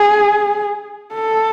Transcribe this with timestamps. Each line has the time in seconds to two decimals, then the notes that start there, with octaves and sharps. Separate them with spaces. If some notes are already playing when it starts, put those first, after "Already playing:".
Already playing: G#4
1.14 A4